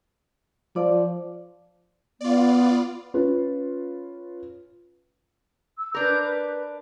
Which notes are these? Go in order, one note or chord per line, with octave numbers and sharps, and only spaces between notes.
F3 D5
B3 F4 D5
C#4 F4 B4
E6
D4 A#4 B4 D6 G6
B4